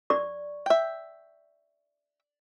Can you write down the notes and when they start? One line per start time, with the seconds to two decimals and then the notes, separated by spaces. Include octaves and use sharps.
0.10 D5 C#6
0.66 E5 G5